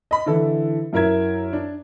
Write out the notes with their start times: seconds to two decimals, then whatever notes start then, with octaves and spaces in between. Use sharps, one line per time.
0.11 D#5 B5
0.26 D3 E3 E4 A4
0.93 F#2 E4 A#4 E5 G#6
1.53 D4